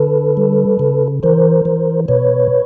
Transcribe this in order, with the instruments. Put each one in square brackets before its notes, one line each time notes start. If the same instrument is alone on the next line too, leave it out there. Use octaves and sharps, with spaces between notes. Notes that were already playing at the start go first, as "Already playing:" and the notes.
Already playing: [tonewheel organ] D3 A4 B4
G3
C#3
E3 A#4 C5
E3
B2 B4 C#5